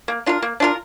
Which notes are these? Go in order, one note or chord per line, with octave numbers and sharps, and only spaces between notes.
A#3
D4 F4 A#4
A#3
D4 F4 A#4